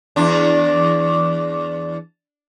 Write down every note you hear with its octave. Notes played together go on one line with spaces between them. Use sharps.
E2 D4